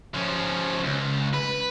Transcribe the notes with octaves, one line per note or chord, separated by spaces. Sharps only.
F3 C#4
C#2
B4